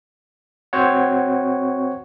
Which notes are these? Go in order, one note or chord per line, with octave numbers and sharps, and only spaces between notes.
C4 F#4 C5 C#5 F#5